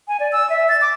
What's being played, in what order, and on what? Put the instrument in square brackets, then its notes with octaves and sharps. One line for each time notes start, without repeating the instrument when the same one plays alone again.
[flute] G#5
D5
E6
E5
A6
D6